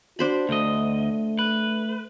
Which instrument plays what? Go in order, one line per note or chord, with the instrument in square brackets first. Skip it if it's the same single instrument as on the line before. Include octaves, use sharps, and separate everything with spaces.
[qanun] D4 C5 B5 [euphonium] F#4
[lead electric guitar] D2 D#5 [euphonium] A3
[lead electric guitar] B4